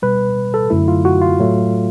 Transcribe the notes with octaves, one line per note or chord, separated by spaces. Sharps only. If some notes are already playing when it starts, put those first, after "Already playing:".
B2 G3 B4
A4
F#2 D3 F#3 A3 E4
F4
F#4
F4
A2 F#3 A3